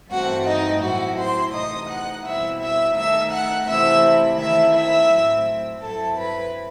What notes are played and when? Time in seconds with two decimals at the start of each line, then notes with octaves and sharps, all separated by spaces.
0.10 G2 E3 A3 C4 F#4 F#5
0.46 D#4 D#5
0.82 A2 F#3 C4 E4 F#4 F#5
1.18 C5 C6
1.54 C3 E3 A3 D#4 D#5 D#6
1.88 F#5 F#6
2.24 B2 G3 C4 E4 E5 E6
2.60 E5 E6
2.95 D#3 A3 D#4 E5 E6
3.31 F#5 F#6
3.67 C3 E3 A3 C4 E4 E5 E6
4.39 D#3 A3 C4 E4 E5 E6
4.74 E5 E6
5.09 A2 F#3 C4
5.81 G2 F#3 C4 E4 A4 A5
6.17 B4 B5